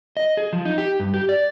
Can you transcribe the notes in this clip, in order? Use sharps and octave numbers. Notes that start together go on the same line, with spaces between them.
D#5
G#4
F3
D#4
G4
G2
G4
D5